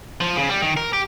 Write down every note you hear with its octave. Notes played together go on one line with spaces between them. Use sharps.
F3
C#3
G3
D#3
A#4
G4